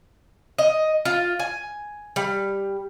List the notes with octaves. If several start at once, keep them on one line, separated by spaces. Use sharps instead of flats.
D#5
F4
G#5
G3